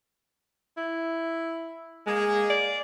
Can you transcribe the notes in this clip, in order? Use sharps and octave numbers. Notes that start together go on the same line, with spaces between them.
E4
G#3 A#3 G#4
D5